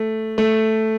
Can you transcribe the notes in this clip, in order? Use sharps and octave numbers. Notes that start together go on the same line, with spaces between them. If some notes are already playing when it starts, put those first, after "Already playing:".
Already playing: A3
A3